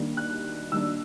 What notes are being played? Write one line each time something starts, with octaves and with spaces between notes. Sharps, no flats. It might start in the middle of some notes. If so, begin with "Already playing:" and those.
Already playing: D#3 G3 A#3 D4
F#6
D#3 G3 A#3 D4 E6